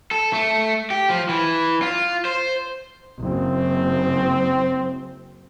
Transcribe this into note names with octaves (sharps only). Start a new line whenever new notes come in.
A4
A3
G4
F3
E3
F4
C5
F#1 C4